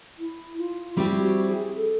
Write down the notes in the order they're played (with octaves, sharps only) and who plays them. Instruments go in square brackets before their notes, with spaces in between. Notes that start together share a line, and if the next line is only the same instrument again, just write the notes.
[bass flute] E4
F4
[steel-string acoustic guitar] G3 C4 E4 G4 [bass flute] F#4
[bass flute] F#4
G#4
A4